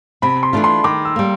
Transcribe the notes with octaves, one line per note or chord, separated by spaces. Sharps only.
C3 B5
C6
E3 A3 D4 F4
C6
D#3 D6
E6
G3 A#3